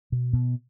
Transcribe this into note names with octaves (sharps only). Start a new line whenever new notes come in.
B2
B2